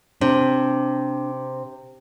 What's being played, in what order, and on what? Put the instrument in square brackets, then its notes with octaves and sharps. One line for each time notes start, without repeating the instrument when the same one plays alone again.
[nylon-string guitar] C3 [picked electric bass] D4